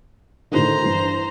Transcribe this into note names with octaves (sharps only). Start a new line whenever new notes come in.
A2 D3 D#3 C5 A#5
G2 E3